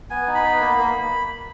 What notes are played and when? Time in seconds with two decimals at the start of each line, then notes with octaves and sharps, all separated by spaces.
0.10 B3 G#5
0.27 D#4
0.35 B5
0.44 B3
0.60 A#3
0.78 A#3